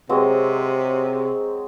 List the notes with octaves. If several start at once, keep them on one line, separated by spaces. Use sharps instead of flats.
C3 F#3 G#3 C4